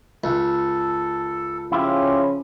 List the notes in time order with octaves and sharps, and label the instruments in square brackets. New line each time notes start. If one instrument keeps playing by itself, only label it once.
[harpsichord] C#2 [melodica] A4
[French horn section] C#3 F3 C#4 [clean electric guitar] E4 F4 [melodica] G4